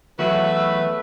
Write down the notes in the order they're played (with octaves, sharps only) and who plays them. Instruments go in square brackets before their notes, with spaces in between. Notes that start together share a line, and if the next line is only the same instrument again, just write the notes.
[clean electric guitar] E2 F#3 F#4 [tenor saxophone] A3 [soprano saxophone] B4 [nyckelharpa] E5